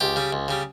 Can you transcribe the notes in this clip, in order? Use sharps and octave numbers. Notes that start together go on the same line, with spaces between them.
C#2 G4
C#3 G3
C#2
C#3 G3